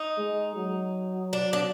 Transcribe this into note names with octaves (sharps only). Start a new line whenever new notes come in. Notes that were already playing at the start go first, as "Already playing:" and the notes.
Already playing: D#4
G#3
F#3
D4
D4